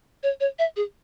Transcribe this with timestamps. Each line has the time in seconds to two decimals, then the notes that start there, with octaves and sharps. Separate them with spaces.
0.23 C#5
0.40 C#5
0.59 E5
0.76 G#4